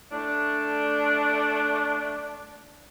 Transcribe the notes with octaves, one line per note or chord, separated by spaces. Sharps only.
A3 D4